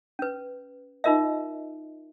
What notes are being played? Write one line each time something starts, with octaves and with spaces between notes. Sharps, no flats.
C#4 B4
D#4 F4 A#4 D#5 E5